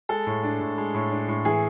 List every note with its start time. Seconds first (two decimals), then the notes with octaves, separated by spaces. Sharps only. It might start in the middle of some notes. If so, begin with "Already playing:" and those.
0.09 G#3 A4
0.27 A2
0.43 D4
0.61 A2
0.78 G#3
0.95 A2
1.12 D4
1.28 A2
1.45 E3 G#4